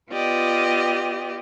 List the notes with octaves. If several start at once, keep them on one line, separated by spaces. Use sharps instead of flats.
B3 F4 G4 D5 D#5